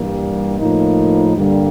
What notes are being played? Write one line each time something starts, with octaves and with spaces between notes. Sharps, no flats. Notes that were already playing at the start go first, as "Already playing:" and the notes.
Already playing: G2 E3 G3 A#3
A2 F3 A#3 D#4
G2 D3 G3 A#3